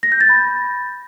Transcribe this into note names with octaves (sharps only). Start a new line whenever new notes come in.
A#6
G6
A6
B5